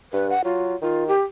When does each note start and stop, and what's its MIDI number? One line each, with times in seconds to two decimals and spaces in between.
0.13 0.34 43
0.13 0.27 71
0.30 0.41 78
0.45 0.75 54
0.45 0.80 65
0.82 1.12 51
0.82 1.07 65
1.08 1.22 67